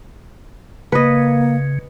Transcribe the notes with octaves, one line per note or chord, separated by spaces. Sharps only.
C#3 A#3 B4 D#5